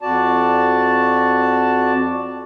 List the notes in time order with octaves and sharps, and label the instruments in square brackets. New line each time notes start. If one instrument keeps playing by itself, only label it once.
[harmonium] F2 F#4 D5 A5